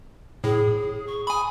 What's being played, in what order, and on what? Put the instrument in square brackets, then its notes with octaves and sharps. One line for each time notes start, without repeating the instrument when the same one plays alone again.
[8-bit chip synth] A2 [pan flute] G#4
[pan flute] C#6
[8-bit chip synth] G#5 B5 [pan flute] D#6